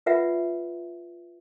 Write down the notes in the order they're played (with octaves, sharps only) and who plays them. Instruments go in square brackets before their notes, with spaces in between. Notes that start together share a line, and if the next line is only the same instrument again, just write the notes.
[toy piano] F4 B4 D5 E5 F#5